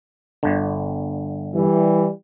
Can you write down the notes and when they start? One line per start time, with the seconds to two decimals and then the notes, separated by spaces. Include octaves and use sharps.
0.43 G1 D3
1.55 E3 G3